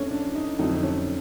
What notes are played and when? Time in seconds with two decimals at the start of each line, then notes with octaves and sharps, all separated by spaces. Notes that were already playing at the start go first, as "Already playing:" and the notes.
Already playing: F2 A3 C#4 D4
0.11 D4
0.35 D#4
0.59 F2 D3 F#3 A3 D#4
0.83 C#4